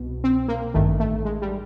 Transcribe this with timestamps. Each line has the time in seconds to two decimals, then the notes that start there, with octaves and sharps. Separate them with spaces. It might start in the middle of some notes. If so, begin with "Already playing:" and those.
Already playing: C2 B2
0.24 C4
0.48 A#3
0.74 A1 G2 D#3 A3
1.00 A3
1.25 G#3
1.42 G3